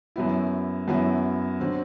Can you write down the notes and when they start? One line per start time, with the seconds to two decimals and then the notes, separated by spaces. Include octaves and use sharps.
0.16 F#2 F#3 B3 E4
0.88 F#2 F#3 B3 E4
1.60 D3 F#3 C4